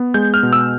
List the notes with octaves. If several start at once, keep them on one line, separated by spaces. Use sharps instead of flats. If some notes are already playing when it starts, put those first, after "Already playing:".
Already playing: B3
G#3 G6
F6
B2
E6